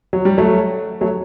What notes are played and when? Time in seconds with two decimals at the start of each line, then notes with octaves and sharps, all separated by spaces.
0.13 F#3
0.25 G3
0.38 F#3 A3
1.01 F#3 A3